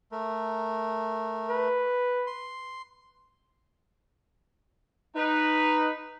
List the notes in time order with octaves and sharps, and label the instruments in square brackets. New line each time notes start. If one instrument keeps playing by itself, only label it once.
[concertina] A3 A#4
[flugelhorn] B4
[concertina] C6
[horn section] D#4 B4